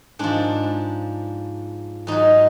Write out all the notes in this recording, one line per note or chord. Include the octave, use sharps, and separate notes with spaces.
G#2 F3 D4
G#2 F#3 D#4